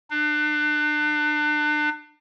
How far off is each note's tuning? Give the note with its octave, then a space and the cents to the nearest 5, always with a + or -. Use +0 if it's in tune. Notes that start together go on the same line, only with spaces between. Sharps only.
D4 +35